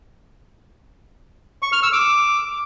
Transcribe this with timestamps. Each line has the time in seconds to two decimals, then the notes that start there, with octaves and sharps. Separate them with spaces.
1.62 C#6
1.73 F6
1.83 E6
1.93 D6